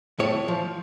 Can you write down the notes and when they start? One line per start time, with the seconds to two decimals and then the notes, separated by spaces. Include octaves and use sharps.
0.19 A2 C#5
0.48 F3